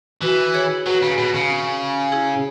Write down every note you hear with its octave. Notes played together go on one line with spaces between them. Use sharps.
E3 F#4 B4
G#4 C#5
F#3 F#4 B4
C#3
B2
C#3
E4 G#4